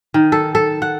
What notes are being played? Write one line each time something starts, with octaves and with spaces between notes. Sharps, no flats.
D#3
A4
A4
F#5